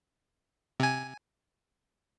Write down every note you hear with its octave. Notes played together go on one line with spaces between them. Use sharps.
C3 G#5